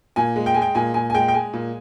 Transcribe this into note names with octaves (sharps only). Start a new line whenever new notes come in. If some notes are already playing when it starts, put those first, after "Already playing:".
A#2 G#5
G#3
G5
G#3 G#5
G5
A#2 G#5
A#2 G#5
G#5
G#3 G5
G5
G#3 G#5
A#2